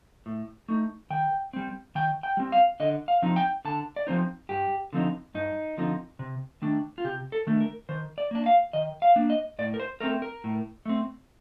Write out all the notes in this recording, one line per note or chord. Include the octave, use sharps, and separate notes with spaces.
A2
A3 D#4
D#3 G5
G3 C4
D#3 G5
G5
G3 C4
F5
D3 D#5
F5
F3 C4 D#4
G5
D3 A5
D5
F3 C4 D#4 C5
G2 G4
D3 F3 C4 D#4
G2 D#4
D3 F3 C4 D#4
C3
D#3 A3 D4
F4
C3 G4
A4
D#3 A3 D4
A#4
D#3 C5
D5
A#3 D4
F5
D#3 D#5
F5
A#3 D4
D#5
A2 D5
A#4
C5
A3 C4 A#4
A#4
A2
A3 C4